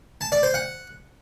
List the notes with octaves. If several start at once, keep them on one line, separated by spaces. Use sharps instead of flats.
A5
D5
C5
F#5